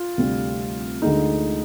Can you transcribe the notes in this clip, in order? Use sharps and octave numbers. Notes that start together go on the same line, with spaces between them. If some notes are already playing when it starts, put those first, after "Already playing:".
Already playing: F4
D2 C3 G3
D2 D3 G#3 D#4